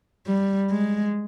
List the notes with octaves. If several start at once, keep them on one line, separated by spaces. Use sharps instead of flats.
G3
G#3